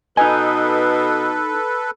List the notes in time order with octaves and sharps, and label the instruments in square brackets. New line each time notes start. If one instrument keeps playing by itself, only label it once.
[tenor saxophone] B2 [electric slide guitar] D#4 D#5 [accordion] A4 B4 [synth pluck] G#5